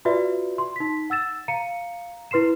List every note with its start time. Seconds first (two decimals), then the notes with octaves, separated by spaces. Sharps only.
0.05 F4 F#4 B4 D5 E5
0.58 C6
0.76 D#4 B6
1.10 F#5 E6 A6 E7
1.48 F5 A#5 C#7 D#7
2.31 E4 B4 C6 C7 E7